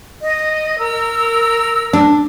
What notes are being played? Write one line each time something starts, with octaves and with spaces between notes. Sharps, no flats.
D#5
A#4 E6
D4